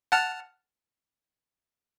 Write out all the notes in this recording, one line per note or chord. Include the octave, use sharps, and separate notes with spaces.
F#5 A5 F6